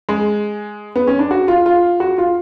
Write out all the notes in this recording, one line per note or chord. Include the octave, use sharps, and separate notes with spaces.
G#3
B3
C#4
D4
F#4
F4
F4
F#4
F4